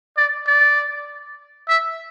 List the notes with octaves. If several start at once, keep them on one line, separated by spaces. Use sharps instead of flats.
D5
D5
E5